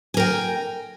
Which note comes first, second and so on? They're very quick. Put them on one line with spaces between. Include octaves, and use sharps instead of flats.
G#5 A#4 G5